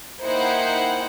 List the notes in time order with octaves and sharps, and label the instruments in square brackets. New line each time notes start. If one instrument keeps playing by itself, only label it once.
[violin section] A#3 D#4 E4 C5 F#5 G5